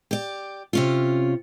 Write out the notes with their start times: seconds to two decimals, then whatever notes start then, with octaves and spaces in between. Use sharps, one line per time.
0.11 G4 D5
0.73 C3 C#4 F4